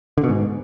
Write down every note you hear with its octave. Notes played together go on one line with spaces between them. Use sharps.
D3
B2
G#2